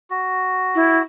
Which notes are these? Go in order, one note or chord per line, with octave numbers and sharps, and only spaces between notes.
F#4
E4